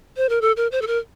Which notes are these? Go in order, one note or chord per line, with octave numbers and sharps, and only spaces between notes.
C5
A#4
A4
A#4
C5
A4
A#4